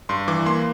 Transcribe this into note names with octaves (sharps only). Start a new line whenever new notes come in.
G2 C6
E3 D6
A#3 C6